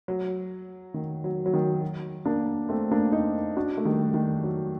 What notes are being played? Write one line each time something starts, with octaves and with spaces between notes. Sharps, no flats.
F#3
D#3
F#3
F#3
D#3
F#3
A#3 D4
A3 C4
A#3 D4
C4 D#4
D4 F#4
A3
D#3 G3
D#3
F#3